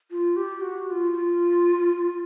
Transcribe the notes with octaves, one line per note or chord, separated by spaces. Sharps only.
F4
G4
F#4
F#4
F4
F4